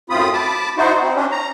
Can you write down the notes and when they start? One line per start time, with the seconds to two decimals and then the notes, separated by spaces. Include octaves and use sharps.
0.10 F#2 A2 C4 F4 B5 D#6
0.33 A5 B5 D6
0.77 D#4 E4 F#4 C5
1.01 C4
1.15 C#4 D4
1.31 A#5